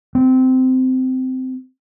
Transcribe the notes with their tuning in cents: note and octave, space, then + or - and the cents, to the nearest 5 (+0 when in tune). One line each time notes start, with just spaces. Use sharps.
C4 -20